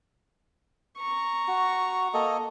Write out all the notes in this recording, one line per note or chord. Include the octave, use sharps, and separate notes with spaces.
A#5 C#6
F#4
A#3 A4 D#5